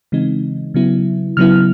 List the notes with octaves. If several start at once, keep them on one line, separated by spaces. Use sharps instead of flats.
C#3 E3 G#3 C4 D#4
C#3 F#3 B3 E4
C#3 F#3 B3 E4 F6